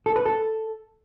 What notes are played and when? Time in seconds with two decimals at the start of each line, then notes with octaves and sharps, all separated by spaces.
0.06 A4
0.16 B4
0.26 A4